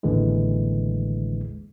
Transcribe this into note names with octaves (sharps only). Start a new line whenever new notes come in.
A1 D#2 A2 D3 E3 G#3